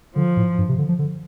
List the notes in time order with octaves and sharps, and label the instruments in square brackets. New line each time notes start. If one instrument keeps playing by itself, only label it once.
[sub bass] D3 [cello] F3
[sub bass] A2
G2
C3
D3
F3
D3